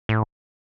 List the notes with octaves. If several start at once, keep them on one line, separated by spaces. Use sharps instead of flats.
A2